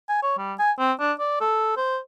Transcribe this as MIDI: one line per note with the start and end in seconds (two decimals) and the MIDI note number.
0.09 0.22 80
0.23 0.37 73
0.38 0.53 55
0.59 0.71 80
0.79 0.92 60
0.99 1.12 62
1.19 1.39 74
1.41 1.73 69
1.77 1.99 72